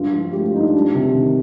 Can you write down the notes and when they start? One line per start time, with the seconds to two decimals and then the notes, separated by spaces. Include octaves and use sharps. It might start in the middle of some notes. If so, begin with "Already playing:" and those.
Already playing: G2 F4
0.12 F3
0.32 A3 G4
0.43 F4
0.53 G2 D#4
0.63 D4
0.74 G3 D4
0.94 C3
1.15 D#3